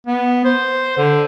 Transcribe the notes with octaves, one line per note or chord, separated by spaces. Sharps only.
B3
C5
D3